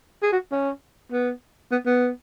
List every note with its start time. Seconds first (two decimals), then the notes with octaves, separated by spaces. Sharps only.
0.23 G#4
0.32 F#4
0.52 C#4
1.12 B3
1.72 B3
1.86 B3